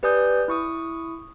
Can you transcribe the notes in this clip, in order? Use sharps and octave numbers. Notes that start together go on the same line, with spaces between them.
G4 B4 D5 G#5 D#6 G6
E4 C#6 D#6